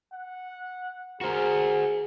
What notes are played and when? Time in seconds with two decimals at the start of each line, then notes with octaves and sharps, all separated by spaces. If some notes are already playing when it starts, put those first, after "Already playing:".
0.12 F#5
1.21 F#4 G#4 A#4 C5